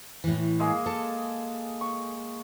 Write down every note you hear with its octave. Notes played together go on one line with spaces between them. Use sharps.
A2 E3
G#3 A#3 G#4
A4 A5
C#6